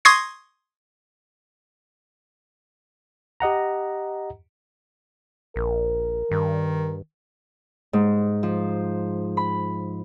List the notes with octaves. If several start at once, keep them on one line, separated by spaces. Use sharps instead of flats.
C6 C#6 D#6 G#6 A#6 C7
G4 D#5 F#5 A#5
A#1 A#4
G2 D#3
G#2
F3
B5